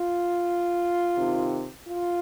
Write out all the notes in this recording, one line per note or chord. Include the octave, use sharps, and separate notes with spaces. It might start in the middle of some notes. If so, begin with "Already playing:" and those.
Already playing: F4
C3 D#3
F4